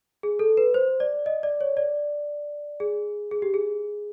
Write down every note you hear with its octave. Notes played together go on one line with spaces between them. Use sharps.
G#4
A4
B4
C5
D5
D#5
D5
C#5
D5
G#4
G#4
G4
G#4